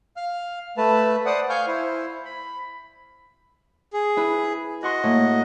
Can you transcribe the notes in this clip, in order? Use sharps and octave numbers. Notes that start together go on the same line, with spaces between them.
F5 F6
A3 B4 A5
C5 D5 F#5 D#6
F5 G#5 C#6 F6 G6
E4 C5
B5
G#4
E4 B4
F#4 D#5 C6 C#6 F#6
A2 A#3